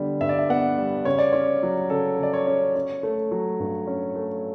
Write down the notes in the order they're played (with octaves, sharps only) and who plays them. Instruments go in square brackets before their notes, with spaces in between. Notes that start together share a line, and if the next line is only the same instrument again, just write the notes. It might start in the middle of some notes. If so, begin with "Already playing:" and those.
Already playing: [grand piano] D3 G3 B3
G2 E5
D5
E5
B3 F#5
G3
C#3 C#5
D5
C#4 C#5
F#3
C#3 A4
C#3 D5
C#5
C#4
C#4
A3
F#3
G2
C#4
A3